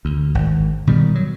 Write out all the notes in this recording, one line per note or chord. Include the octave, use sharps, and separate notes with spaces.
D2
G#1
B2 D#3 G3
F#3